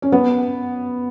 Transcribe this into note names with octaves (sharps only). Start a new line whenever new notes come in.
C#4
B3